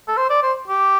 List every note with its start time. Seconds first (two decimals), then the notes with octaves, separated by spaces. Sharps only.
0.08 A4
0.17 C5
0.30 D5
0.43 C5
0.68 G4